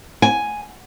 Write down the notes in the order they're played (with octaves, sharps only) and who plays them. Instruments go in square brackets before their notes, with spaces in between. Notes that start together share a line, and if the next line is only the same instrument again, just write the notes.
[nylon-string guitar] G#5